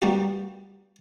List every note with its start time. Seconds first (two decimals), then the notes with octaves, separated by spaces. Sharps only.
0.02 G3 A#3 B3 D4 F#4 G4